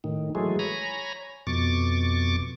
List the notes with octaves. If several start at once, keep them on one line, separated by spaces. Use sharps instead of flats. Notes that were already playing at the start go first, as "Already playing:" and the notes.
A2 D#3
E3 F#3 G#3 A3 G#4
C#5 G#5 A#5 B5 A#6
F2 B2 C#6 D6 A6